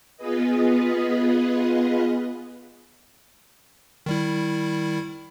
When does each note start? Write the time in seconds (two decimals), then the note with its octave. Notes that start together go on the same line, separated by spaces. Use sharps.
0.17 B3 F4 G#4 B4 D#5
4.06 D#3 G3 E4